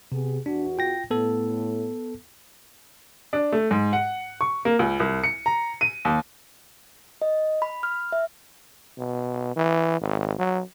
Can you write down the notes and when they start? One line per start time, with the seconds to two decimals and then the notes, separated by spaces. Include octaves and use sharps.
0.12 C3 B3 G4 G#4
0.46 E2 D4 F#4
0.78 F4 G5 A#6
1.11 A2 B3 A4
3.33 D4
3.52 A3
3.71 G#2
3.93 F#5
4.41 C#6
4.65 A#3
4.79 C#2
5.00 C2
5.24 C#7
5.46 A#5
5.81 D#7
6.05 D#2
7.22 D#5
7.62 B5
7.83 F6
8.12 E5
8.98 B2
9.56 E3
10.01 G#1
10.39 F#3